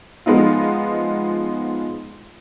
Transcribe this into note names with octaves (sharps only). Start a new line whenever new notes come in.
F3 G#3 B3 D#4 F4